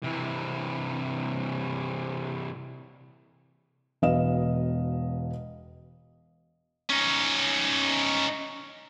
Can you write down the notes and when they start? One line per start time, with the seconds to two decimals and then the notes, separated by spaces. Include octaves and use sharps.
0.04 C3 E3
4.02 E1 B2 B4 D#5 F5 E7
6.89 C#4 D#4